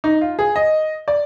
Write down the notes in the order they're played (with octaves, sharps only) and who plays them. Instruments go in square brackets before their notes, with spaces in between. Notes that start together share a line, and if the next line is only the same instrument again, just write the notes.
[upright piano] D#4
F4
G#4
D#5
D5